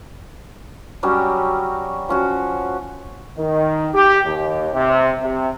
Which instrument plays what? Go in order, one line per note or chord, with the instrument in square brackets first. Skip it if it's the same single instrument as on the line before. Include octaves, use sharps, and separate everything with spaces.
[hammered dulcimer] F#3 G3 C#4 G4
F3 C#4 F#4
[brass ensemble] D#3
G4
D#2
C3
C3